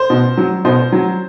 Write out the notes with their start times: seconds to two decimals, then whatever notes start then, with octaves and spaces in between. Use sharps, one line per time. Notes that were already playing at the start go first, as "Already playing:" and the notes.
Already playing: C5
0.10 B2
0.37 F#3
0.65 B2 C5
0.92 F#3